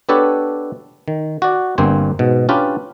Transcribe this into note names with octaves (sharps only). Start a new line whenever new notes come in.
B3 D4 G4 A4 B4 C#5
D#3
F#4 D5
G1 G2 A#3 C4 C5 G#5
G#2 B2
C#4 D4 F4 G4 B4 D5